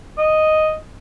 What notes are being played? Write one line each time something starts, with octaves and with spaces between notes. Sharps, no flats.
D#5